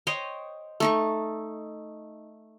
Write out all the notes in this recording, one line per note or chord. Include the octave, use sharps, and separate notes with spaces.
C5 C#5 D#5 G5
A3 D#4 C#6